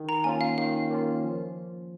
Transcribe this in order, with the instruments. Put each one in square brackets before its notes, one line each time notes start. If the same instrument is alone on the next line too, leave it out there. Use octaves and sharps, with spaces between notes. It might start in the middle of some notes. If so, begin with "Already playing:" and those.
Already playing: [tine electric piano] D#3
[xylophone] A#5
[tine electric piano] A#3 C#4 F4 [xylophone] G#5
[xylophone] F5
[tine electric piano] D#3 [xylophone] F5
[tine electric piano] A#3 C#4 F4
F3